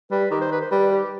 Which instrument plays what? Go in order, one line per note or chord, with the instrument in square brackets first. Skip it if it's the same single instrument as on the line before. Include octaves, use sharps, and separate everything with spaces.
[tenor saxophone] G3 [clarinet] B4
[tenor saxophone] D#3 [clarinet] G4
[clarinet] C5
B4
C5
[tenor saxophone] G3 [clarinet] B4
[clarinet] G4